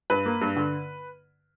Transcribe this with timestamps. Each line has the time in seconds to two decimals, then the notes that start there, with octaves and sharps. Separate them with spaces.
0.10 G2 B4
0.26 A#3
0.41 G2
0.56 D3